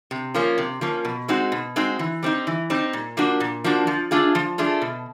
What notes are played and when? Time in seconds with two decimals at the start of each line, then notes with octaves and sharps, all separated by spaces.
0.11 C3
0.34 F3 A#3 C#4
0.58 C3
0.81 F3 A#3 C#4
1.05 B2
1.28 G#3 C4 D#4 F#4
1.52 B2
1.76 G#3 C4 D#4 F#4
1.99 E3
2.23 G3 C4 D#4
2.47 E3
2.70 G3 C4 D#4
2.93 A#2
3.17 F3 A#3 D4 F#4
3.40 A#2
3.64 F3 A#3 D4 F#4
3.87 F3
4.11 A3 D4 F4 G#4
4.35 F3
4.58 A3 D4 F4 G#4
4.82 B2